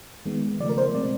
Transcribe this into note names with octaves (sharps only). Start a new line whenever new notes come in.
D#3 G#3 B3
C#3 F3 A3 D5
A#4
C5
B2 G#3 C4 D5